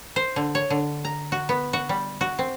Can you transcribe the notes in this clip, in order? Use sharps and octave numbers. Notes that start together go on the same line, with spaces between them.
C5
D3
C#5
D3
A#5
F#4
B3
F#4
G3
F#4
C4